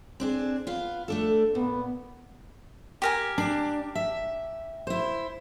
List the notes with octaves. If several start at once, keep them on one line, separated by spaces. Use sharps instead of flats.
C4 D4 G#4
B3 F4 F5
A3 D4 A4
A#2 B3
G4 A#4 G#5
D4
E5
E4 C5